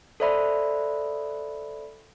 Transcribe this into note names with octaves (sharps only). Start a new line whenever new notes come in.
A4 C5 D5 E5 B5